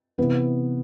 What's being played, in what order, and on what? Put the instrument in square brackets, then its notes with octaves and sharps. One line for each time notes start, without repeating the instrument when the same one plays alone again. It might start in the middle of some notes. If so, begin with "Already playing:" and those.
[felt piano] C3 E3 B3 B4